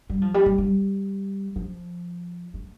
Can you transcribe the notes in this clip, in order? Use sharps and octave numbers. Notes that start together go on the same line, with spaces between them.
G3
F3
G3
G3
G3
F3
A3